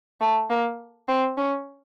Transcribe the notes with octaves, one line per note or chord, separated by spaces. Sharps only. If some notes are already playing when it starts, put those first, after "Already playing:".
A3
A#3
C4
C#4